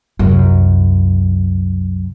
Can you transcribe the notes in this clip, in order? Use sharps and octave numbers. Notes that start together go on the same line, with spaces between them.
C2 F#2